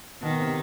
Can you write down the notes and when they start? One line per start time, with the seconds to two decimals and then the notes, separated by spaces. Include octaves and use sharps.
0.22 B2 D#3
0.39 C3